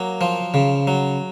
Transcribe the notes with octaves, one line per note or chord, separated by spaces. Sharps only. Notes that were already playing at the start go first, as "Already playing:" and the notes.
Already playing: F#3 A#3
F3
C#3
F#3